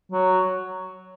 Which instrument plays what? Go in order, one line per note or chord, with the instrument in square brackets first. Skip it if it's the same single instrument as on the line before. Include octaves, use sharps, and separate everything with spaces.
[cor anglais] F#3